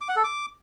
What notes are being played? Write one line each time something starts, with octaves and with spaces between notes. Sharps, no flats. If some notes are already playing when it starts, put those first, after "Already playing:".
D6
F#5
A4
D6